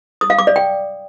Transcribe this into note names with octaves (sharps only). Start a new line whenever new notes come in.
D#6
F5
D6
D5
G5